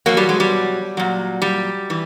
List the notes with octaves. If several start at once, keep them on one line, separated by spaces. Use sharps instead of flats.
E2 B2 F#3 A#3
G3
G#3
G3
A#2 F#3
G3
E3